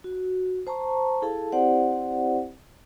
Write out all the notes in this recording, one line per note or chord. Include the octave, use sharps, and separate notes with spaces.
F#4
C5 A5 A#5 C#6
E4 G#4 A4 F5 A5
C4 E4 G4 C5 D5 F#5